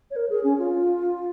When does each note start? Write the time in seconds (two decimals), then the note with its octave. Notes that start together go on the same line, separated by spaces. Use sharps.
0.11 C#5
0.16 A#4
0.30 G#4
0.44 C#4
0.58 F4